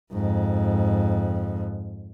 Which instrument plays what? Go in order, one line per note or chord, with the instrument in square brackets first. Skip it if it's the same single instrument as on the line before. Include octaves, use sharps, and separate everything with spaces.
[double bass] F2 G#2